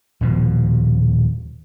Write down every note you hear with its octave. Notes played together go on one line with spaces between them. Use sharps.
D#1 B2 F3